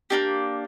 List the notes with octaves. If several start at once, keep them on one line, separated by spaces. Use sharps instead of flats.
A#3 D4 G4